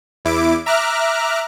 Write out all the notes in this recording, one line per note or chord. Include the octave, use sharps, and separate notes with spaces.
E2 E4 D6 D7
E5 A#5 D6 F6 F#6